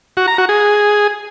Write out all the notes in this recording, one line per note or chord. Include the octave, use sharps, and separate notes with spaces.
F#4
A#5
F#4
G#4